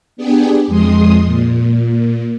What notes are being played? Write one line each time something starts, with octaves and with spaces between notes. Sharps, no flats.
B3 D4 G4 G#4
F2 G#3 C6 D#6
A#2